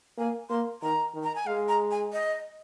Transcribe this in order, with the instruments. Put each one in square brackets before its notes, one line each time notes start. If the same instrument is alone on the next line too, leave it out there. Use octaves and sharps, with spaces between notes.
[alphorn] A#3 [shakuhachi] G#5
[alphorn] A#3 [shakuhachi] C6
[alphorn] D#3 [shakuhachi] A#5
[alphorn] D#3
[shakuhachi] A#5
G#5
[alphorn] G#3 [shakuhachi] F5
[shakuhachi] A#5
G#5
D#5